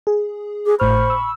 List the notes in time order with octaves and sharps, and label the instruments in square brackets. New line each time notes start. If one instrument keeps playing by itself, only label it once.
[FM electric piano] G#4
[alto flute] G#4 [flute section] D6
[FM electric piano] G#1 A2 F6 [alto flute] C5 [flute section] B5 C#6
[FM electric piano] E6